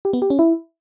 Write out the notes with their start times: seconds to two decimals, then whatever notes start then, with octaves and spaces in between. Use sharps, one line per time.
0.05 G4
0.13 B3
0.22 G4
0.30 C#4
0.39 E4